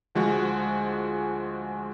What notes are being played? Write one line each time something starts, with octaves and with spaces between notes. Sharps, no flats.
D2 F3 G#3 F#4